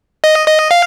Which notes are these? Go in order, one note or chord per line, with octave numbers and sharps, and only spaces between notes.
D#5
D#5
F5